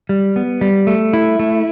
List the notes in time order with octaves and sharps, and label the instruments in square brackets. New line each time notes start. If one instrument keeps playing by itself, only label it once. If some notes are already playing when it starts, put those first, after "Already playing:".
[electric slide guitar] G3
B3
G3
A3
E4
A3